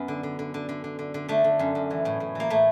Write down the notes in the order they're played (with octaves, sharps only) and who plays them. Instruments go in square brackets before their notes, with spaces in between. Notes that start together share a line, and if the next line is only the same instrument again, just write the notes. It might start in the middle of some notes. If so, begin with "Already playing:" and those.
Already playing: [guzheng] F#2 B3
D3
D3
D3
D3
D3
D3
D3
D3
D3 A3
D3
F#2
F#2
E3
A2
A2
E3 A#3
A2 A3